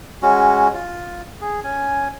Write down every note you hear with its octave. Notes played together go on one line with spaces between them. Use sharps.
G#3 C#4 F#4
F4
G#4
C#4 G#5